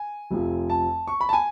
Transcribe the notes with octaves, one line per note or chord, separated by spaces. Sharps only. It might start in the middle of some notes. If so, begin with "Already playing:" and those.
Already playing: G#5
F1 F2 F3
A5
C#6
B5
A5
G#5